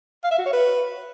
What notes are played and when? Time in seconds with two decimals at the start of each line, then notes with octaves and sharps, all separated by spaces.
0.24 F5
0.31 E5
0.39 F#4
0.46 C#5
0.53 B4